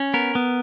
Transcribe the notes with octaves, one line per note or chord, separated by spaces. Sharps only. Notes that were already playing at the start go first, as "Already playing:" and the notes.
Already playing: C#4
B3 A#4
B3